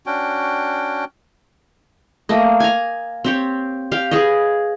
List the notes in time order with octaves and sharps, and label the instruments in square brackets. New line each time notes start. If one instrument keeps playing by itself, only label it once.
[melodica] C#4 D4 F#4 G5
[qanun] A3 A#3 D#5
G#5 A#5
C4 G4 C#5
G4 F5
G#4 B4 C#5 D#5